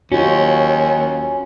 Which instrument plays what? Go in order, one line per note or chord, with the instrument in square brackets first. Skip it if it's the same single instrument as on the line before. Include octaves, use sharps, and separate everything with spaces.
[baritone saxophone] D#2 [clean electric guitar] C#4 [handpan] F4 F#4